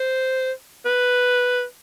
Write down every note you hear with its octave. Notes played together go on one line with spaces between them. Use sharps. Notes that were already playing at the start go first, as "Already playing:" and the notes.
Already playing: C5
B4